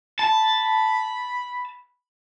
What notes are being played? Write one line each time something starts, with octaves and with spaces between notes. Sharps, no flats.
A5 B5